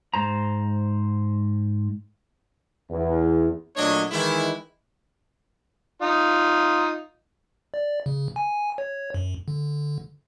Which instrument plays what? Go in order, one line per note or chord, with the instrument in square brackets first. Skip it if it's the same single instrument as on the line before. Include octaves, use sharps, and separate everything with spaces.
[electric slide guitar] G#2 C5 A#5
[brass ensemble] E2
[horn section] A#2 F#3 A3 D4 C#5 D#5
D#3 E3 G#3 D#4 E4
[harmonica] D#4 F4
[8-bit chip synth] D5
C#3
G#5
C#5
F#2
D3